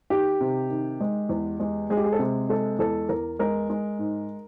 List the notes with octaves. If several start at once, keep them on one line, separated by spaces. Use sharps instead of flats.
D#3 G4
C3
D#3
G#3
E2
G#3
G#3 G#4
G4
G#4
A4
C3 G#4
G#3 A4
E2 A4
E2 A#4
G#3 A#4
G#3
G#2